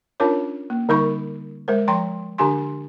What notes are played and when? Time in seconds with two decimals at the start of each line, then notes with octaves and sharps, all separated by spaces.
0.20 C#4 D4 F4 A#4 C#5
0.70 A#3
0.89 D3 G3 D#4 A#4 B5 C#6
1.68 G#3 A#4 C5
1.88 F3 G5 A#5 C6
2.38 D3 D4 G4 G#5 C6